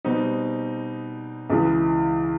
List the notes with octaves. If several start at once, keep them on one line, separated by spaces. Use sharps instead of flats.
B2 G3 C4 D#4
C#2 C#3 E3